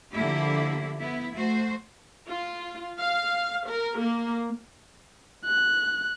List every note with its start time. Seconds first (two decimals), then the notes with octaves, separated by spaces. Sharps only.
0.13 D3 F3 A#3 E4 G4
1.01 B3 E4
1.35 A3 F#4 C5
2.28 F4
2.99 F5
3.68 A#4
3.99 A#3
5.45 F#6